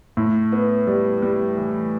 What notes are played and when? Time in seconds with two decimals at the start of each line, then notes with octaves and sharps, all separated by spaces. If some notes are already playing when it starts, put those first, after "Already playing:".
0.17 A2
0.52 B3
0.87 G3
1.22 G3
1.58 E3